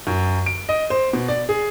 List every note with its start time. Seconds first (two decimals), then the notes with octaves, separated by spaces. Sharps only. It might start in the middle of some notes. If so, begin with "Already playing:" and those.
0.07 F#2
0.46 D7
0.69 D#5
0.90 C5
1.13 B2
1.29 D5
1.49 G#4